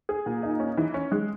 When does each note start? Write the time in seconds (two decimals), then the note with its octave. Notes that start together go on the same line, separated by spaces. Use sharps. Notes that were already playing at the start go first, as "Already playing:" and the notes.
0.09 G#4
0.26 A#2
0.43 D#4
0.60 C#4
0.77 E3
0.94 C#4
1.12 G#3